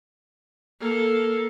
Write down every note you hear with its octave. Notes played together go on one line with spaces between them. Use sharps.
A#3 A4